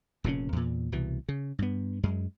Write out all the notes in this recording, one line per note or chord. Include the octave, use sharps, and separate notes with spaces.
F1 A#2 C#3 C#4
E2 A#2
C2 B2 E3
C#3
G2 B3
F#2 G#3